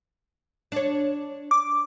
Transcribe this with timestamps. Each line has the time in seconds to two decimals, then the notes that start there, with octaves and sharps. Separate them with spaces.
0.72 D4 C#5
1.51 D6